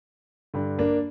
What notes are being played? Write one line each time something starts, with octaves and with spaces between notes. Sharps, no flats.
G2 D3
A#3 D4